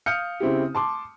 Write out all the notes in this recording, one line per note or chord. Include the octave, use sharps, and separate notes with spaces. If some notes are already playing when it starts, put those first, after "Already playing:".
F5 D#6 F6 G6 C#7
C#3 C4 E4 G4
A5 C6 D6